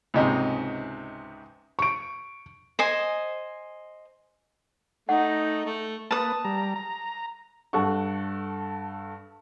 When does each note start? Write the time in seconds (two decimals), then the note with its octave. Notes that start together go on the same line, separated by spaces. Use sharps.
0.14 C#2 G#2 C3 D#5 A#5
1.79 C#6 D7
2.79 C5 D#5 G#5
5.09 A3 D#4 F#5
5.66 A3
6.11 A#3 B4 A5 D#6
6.45 G3 A#5
6.76 A#5
7.73 G2 A4 F#5 C#6